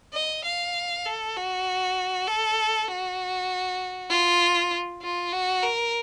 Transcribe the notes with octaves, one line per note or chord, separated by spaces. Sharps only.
D#5
F5
A4
F#4
A4
F#4
F4
F4
F#4
A#4